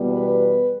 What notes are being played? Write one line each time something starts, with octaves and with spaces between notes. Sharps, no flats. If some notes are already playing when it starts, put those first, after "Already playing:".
Already playing: E2 B2 G3 B3
B4